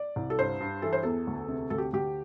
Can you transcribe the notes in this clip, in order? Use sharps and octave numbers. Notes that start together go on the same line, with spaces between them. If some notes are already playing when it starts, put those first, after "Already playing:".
Already playing: D5
C2
A4
G2 C5
G2
E3 A4
C5
E2 A4
D2
C3
D2 A4
G4
D2 G4